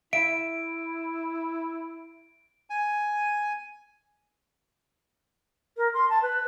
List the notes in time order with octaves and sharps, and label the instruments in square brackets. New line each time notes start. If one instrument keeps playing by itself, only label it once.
[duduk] E4 [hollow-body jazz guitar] E5 [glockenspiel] D7
[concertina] G#5
[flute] A#4
C6
A5
B4